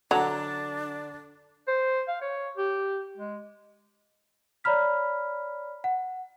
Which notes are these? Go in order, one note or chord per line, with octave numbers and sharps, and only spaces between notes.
D3 F#3 D4 F#5 A5 A#5
C5
F5
C#5
G4
G#3
C#5 D5 A#5 B5 F6 B6
F#5